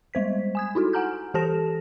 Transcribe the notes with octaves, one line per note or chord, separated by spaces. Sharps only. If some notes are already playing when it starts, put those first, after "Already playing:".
G3 G#3 C5 B6
G#5 D#6 G#6
D#4 E4 F#4 A4
F#5 G#5 A#5 F6 G6
E3 G4 A4 A5 A#6 E7